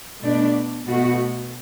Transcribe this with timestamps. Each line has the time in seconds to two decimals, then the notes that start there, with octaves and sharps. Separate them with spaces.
0.20 B2 A3 D4
0.85 B2 A3 F#4